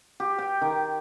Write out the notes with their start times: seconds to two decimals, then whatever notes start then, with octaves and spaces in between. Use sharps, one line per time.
0.20 G4
0.39 G5
0.61 D#3